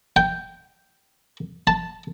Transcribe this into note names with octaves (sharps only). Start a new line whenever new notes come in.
G5
A5